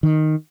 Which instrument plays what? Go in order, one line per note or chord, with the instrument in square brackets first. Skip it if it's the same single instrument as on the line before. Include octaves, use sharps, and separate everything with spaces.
[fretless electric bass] D#3